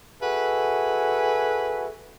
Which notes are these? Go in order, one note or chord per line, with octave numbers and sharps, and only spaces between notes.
F#4 G#4 A4 B4 E5 G#5